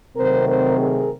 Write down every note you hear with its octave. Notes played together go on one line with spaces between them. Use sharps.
C3 D#3 F#3 A3 C4 A#4 C5
A#4 C5
G#4 A#4